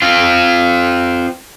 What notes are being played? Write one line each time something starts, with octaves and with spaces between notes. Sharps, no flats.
C4 F4